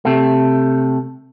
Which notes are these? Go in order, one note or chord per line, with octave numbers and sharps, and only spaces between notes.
C3 A3